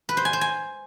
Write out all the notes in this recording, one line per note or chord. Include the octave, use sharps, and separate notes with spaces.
B4
C5
G#5
C5
G#5